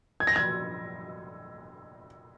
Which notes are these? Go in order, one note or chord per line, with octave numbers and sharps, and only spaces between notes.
G#6
A#6
G#6